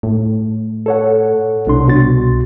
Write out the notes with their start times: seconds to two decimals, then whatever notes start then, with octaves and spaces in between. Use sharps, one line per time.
0.03 A2
0.86 A4 C#5 F#5
1.67 C2 B2 D4 C6
1.87 B2 F#4 A6